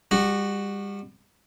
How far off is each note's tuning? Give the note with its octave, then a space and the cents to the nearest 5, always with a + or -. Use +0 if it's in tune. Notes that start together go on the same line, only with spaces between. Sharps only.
G3 +35 F#4 +0